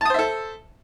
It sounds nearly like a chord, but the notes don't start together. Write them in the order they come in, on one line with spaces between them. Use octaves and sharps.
A5 D#6 C5 E5 A4